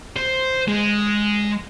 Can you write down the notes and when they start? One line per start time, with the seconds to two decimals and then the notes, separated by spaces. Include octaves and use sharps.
0.17 C5
0.68 G#3